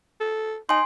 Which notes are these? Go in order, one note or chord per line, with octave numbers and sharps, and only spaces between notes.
A4
D#4 G#5 C6